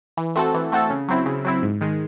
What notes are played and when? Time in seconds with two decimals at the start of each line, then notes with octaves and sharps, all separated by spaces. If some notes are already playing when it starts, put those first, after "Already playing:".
0.17 E3
0.36 A3 C4 F#4 A4
0.54 E3
0.72 A3 C4 F#4 A4
0.90 C#3
1.08 F#3 C4 E4
1.26 C#3
1.45 F#3 C4 E4
1.63 G#2
1.81 D#3 G#3